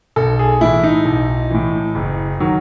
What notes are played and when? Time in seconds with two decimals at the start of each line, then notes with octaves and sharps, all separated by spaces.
0.16 B1 A4
0.39 G#4
0.61 A2 E3 E4
0.83 D#4
1.05 B1
1.51 A2 E3
1.95 F#1
2.40 D#3 F#3